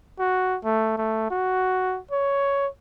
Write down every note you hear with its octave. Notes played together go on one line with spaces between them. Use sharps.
F#4
A3
A3
F#4
C#5